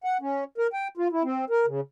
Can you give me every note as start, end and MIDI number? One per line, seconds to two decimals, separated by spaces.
0.04 0.17 78
0.21 0.44 61
0.58 0.67 70
0.73 0.88 79
0.97 1.08 65
1.12 1.23 64
1.24 1.45 60
1.50 1.66 70
1.66 1.81 49